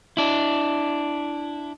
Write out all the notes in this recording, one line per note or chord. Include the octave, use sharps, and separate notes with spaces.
D4 E4